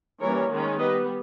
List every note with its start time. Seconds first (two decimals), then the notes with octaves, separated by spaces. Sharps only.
0.21 E3 G3 A#3 C#4 A#4 C#5
0.50 D#3 G#3 C#4
0.78 G3 B3 B4 D#5